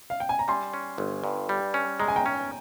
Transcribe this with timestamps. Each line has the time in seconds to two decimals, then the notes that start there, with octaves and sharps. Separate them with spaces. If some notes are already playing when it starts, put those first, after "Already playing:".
0.10 F5
0.20 G5
0.29 G#5
0.39 A#5
0.48 G3 G#5 C6
0.74 C#4
0.98 G1
1.24 G2
1.49 G3
1.74 C#4
2.00 G#3 A#5
2.08 G#5
2.16 G5 A#5
2.26 C#4